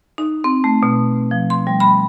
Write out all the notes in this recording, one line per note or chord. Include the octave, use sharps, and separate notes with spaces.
D#4
C4
A3
B2
F3
C6
G3
B5